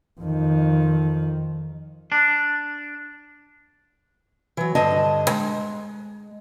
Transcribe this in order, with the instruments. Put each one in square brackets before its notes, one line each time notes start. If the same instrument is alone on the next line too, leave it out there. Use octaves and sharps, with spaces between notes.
[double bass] F2 D#3
[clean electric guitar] D4
[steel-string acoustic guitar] E3 F#3
G2 D3 D#5 A5
G#3